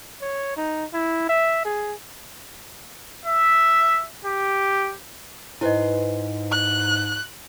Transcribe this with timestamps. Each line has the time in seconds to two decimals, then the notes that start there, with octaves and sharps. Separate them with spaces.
0.22 C#5
0.57 D#4
0.93 E4
1.29 E5
1.65 G#4
3.26 E5
4.25 G4
5.61 G#2 E4 B4 C5 D#5 G#5
6.52 F#6